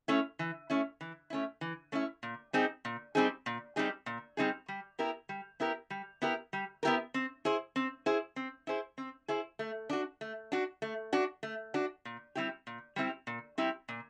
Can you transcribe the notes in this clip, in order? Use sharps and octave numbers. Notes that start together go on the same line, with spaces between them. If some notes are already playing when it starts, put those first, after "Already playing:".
A3 C#4 E4
E3
A3 C#4 E4
E3
A3 C#4 E4
E3
A3 C#4 E4
A#2
G3 C4 D#4 G#4
A#2
G3 C4 D#4 G#4
A#2
G3 C4 D#4 G#4
A#2
G3 C4 D#4 G#4
G3
B3 E4 G4 A#4
G3
B3 E4 G4 A#4
G3
B3 E4 G4 A#4
G3
B3 E4 G4 A#4
C4
E4 G#4 C5
C4
E4 G#4 C5
C4
E4 G#4 C5
C4
E4 G#4 C5
A3
D4 F#4
A3
D4 F#4
A3
D4 F#4
A3
D4 F#4
A#2
G3 C4 E4 G4
A#2
G3 C4 E4 G4
A#2
G3 C4 E4 G4
A#2